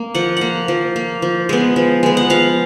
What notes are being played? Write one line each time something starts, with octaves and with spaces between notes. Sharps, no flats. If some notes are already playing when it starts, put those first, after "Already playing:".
Already playing: A#3
F3 F#5
A#3 F#5
F3
A#3
F3
G#3 B3
F3
G#3 B3
F#5
F3 F5